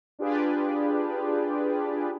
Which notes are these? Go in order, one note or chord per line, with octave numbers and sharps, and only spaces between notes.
D4 F4 G4 G#4 B4 D5